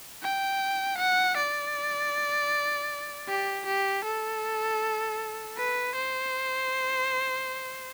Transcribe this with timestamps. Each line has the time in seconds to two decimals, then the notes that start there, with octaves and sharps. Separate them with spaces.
0.23 G5
0.98 F#5
1.37 D5
3.29 G4
3.66 G4
4.05 A4
5.57 B4
5.95 C5